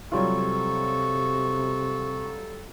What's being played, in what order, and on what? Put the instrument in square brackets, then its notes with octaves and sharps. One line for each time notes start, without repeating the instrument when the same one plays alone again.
[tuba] C3 [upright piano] F#3 G3 F4 [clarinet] A4 [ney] C#6